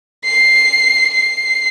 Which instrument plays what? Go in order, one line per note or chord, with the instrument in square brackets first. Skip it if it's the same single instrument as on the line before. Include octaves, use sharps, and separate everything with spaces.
[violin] C7
C7